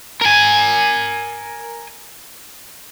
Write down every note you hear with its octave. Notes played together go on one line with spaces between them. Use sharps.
A#4 G#5